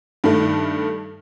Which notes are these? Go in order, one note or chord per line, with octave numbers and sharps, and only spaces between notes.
G2 D#3 A3